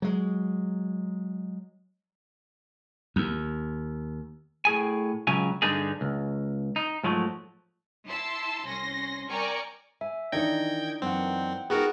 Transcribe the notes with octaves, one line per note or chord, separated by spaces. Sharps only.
F#3 G#3
D#2
A2 G#4 G#5
C#2 C#3 F#3 G#5
G2 D3 D4 D#4 G#4
C#2
D#4
G#2 F3 F#3 A3
E4 A5 C6 E6
C2 C#4 C6 A#6
A#4 D5 G5 G#5 A#5 C#6
E5 G#5
D#3 E3 D4 D#4 C#5 G5 G#6 A#6
F#2 E3 A#3 C4 F#5 G5
B3 D#4 F4 F#4 G#4 A#4